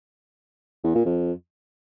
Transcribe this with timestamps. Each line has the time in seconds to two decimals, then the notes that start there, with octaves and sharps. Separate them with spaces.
0.84 E2
0.95 A#2
1.06 F2